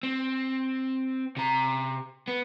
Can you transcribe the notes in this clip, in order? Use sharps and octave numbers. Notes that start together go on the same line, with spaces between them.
C4
C3 A#5
B3